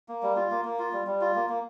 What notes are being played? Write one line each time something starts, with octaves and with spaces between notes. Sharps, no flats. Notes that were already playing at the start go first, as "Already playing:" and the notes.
A#3
G3
F4
A#3
A#3
F4
G3
G3
F4
A#3
A#3